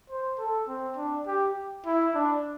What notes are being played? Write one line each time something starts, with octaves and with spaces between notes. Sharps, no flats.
C5
A4
C4
D4
G4
E4
D4